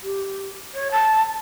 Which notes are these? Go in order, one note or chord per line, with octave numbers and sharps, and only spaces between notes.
G4
C#5
A5